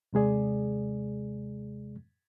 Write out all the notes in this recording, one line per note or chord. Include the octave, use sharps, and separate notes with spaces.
D#2 C3 G#3 G#4 D5